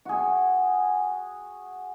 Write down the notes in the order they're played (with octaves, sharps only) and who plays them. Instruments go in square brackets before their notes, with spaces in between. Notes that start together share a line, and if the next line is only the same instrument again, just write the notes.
[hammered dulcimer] F#4 G#4